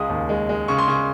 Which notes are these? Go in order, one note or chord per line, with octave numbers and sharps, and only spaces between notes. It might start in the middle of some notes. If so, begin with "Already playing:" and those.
Already playing: C#2 G#3 D#6
D#2
G#3
G#3
C#3 C#6
C6
C#3 C#6